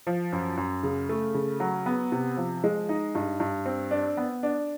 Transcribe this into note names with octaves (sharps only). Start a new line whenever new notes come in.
F3
F#2
F#2
C#3
A3
C#3
F#3
B3
C3
F3
G#3
D#4
G2
G2
C4
D4
B3
D4